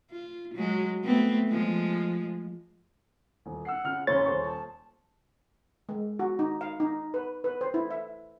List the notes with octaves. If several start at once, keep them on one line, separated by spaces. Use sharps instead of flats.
F4
F#3 G#3
A3 B3 C4
F3 G#3
D#1
F#5 E6 C7
C#3 F4 F6
F#1 C#3 C#5 C6 A6
D#1 C5 C#6
A5
G#3
F#4
D#4
F5
D#4
B4
B4
C5
E4
E5